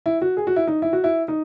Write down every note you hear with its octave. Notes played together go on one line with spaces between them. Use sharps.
E4
F#4
G#4
F#4
E4
D#4
E4
F#4
E4
D#4